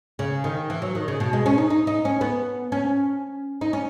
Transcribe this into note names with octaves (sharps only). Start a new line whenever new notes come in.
C#3
D#3
E3
F#3
D#3
C#3
B2
G#3
C#4
D#4
D#4
D#4
C#4
B3
C#4
D#4
C#4